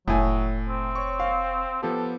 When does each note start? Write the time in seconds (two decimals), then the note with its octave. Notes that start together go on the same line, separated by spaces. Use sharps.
0.08 F1 A2 F#3 G#5
0.68 C4
0.95 C#5 C#6
1.20 F5
1.83 F3 B3 G4 A4